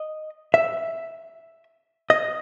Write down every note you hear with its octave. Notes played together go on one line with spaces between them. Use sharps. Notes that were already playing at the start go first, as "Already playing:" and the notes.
Already playing: D#5
E5
D#5